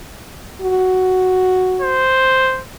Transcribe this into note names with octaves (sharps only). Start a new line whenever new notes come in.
F#4
C5